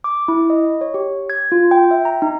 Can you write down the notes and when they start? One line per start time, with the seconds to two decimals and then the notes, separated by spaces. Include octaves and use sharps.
0.04 D6
0.28 E4
0.50 D#5
0.81 C#5
0.94 G4
1.30 G#6
1.52 F4
1.71 G5
1.91 E5
2.05 A#5
2.22 D#4